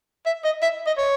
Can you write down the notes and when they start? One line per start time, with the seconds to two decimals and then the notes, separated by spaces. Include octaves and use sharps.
0.26 E5
0.44 D#5
0.62 E5
0.86 D#5
0.98 C#5